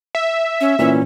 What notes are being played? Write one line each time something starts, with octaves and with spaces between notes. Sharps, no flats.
E5
C#4
A#2 E3 C#4